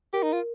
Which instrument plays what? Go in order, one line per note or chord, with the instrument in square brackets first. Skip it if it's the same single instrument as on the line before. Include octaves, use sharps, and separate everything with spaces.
[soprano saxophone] G4 [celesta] A#4
[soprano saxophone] D#4
F4